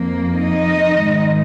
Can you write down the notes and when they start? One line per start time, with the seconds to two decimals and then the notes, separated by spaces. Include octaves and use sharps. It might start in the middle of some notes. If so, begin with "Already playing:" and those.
Already playing: F2 F3 A#3
0.35 D#4 D#5
0.95 G#2 D#3 G#3